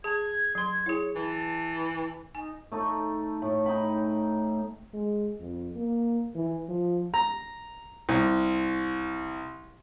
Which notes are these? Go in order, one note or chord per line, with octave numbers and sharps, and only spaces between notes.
G#4 A5 G#6
F#3 C6
E4 G#4 C#5
E3 A5
D#4 G#5
A3 D#4 A4
A2
D#4 G5 B5
G#3
F2
A#3
E3
F3
A#5
C2